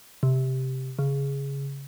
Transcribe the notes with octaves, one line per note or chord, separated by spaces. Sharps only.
C3
C#3